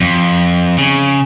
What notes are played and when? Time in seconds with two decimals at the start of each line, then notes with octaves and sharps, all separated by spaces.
0.01 F2
0.78 C#3